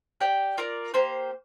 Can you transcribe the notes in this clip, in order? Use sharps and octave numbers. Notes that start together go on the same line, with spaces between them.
G4 D5 G5
F4 A#4 D5
A#3 G4 C5